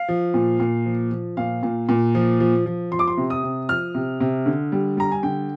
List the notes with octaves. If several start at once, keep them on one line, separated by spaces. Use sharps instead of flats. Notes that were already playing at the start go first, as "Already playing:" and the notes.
Already playing: F5
F3
A#2
A#2
F3
F3
A#2 F5
A#2
A#2
F3
F3
F3
F3 C6
D6
C6
C3
D#6
C3
F3 F6
C3
C3
D3
G3
G3 A#5
G#5
D3 G5